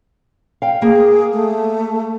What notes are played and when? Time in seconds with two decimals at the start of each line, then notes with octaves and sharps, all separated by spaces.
0.62 F5 G5
0.82 A#3 G#4
1.33 A3